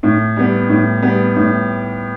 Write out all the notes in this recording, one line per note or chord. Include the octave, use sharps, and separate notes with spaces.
A2
G3 B3
A2
G3 B3
A2